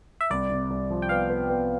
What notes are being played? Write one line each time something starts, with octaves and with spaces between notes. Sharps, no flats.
E5
C2 D5
C3
C2
F3
G5
B3 F5
B3
B3